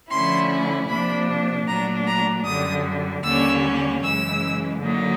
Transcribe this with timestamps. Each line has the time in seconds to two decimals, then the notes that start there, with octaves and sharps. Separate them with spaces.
0.11 D3 F3 A3 C#4 E4 C6
0.90 C3 F3 A#3 D4 B5
1.68 A#2 F#3 A3 D4 A#5
2.07 A#5
2.46 F#2 D3 G3 D#6
3.25 D#2 D3 G3 A#3 C#4 E6
4.04 F#2 C#3 E3 G#3 E6
4.81 D3 F#3 A#3 D#4